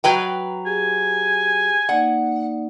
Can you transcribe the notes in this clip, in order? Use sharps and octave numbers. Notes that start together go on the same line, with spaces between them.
F#3 B4 G5
G4 G#4 G#5
A#3 D#4 D5 F#5